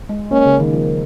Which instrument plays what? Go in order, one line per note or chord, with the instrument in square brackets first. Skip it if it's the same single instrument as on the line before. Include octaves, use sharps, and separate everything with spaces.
[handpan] G#3
[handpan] A#3 [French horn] C#4
[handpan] C#3
D#3
F3